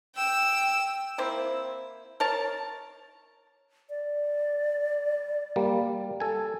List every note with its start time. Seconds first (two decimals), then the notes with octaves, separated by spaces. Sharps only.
0.15 G5 E6
1.18 A#3 C4 E4
2.20 A#4 C#5 A5
3.90 D5
5.56 G3 A#3
6.20 A4 G#5